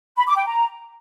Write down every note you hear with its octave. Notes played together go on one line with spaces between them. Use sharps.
B5
D6
G5
A#5